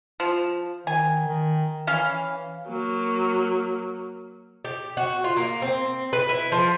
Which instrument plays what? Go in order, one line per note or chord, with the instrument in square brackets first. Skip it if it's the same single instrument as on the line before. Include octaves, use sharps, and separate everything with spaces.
[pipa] F3
[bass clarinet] D#3 [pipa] G#5
[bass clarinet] D#3
[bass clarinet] E3 [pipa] C#4 F5
[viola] F#3 A#3
[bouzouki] G4
F#4
F4
A#3
C4
B4
E4
F3